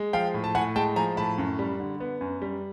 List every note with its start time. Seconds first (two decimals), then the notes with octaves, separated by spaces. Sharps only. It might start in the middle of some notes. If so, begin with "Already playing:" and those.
Already playing: G#3
0.13 F3 F5 G5
0.34 A2
0.44 A5
0.55 A2 F#5 G#5
0.76 G#3 G5 A5
0.96 F3 G#5 A#5
1.17 A2 A5 B5
1.38 F#2
1.59 G3
1.80 D3
2.00 B3
2.21 F#2
2.42 G3